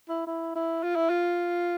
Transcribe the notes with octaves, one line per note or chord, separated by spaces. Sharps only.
E4
E4
E4
F4
E4
F4